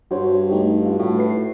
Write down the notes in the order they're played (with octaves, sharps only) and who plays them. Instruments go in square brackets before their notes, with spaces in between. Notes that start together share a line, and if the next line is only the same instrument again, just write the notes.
[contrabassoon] G2 [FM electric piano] F#4 C5 C#5
[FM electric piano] A3 D#4 G4
F4 F#4
[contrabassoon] A2
[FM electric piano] B4 C7